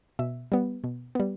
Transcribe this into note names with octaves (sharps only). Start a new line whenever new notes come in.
B2 E5
G3 B3
B2
G3 B3